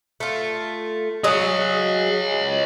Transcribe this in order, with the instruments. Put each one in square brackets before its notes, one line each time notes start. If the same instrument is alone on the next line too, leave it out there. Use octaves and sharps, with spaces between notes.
[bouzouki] A3 F4
[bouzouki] F#3 G#4 [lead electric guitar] C#5 D#5